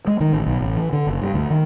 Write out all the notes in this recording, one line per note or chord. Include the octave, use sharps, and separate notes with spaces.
G#3
D#3
A1
B1
A1
E3
D3
F#1
G2
D2
D#3